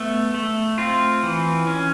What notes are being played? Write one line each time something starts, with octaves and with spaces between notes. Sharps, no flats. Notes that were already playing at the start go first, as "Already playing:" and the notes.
Already playing: A3 B3
A3
C4 F4
E3
C#4